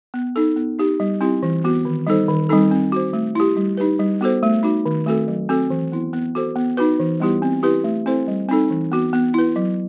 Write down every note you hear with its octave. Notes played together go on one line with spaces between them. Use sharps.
B3
D#4 A4
B3
D#4 G4
G3
C4 E4 G4
E3
B3 F#4
D#3
G3 D#4 A4 C5
D#3
G3 C4 D#4 A4
C4
F#4 C5
A3
E4 G4
G3
D#4 G4 B4
G3
B3 F#4 A4 C5
A3
D#4 F#4
D#3
A3 C4 F#4 A4
F#3
C4 F#4 A4
E3
B3 E4
B3
F#4 A4 C5
B3
D#4 F#4 B4
E3
G3 B3 E4 G4
C4
E4 G4 B4
A3
C4 E4 A4 C5
G3
C4 D#4 A4
E3
B3 F#4
B3
E4 B4
F#3